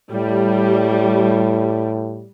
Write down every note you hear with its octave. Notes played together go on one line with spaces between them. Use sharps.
A2 G3